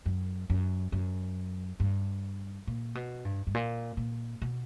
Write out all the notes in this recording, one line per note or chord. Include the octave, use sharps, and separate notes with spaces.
F#2
F#2
F#2
G2
A#2
B2
G2
G2
A#2
A#2
B2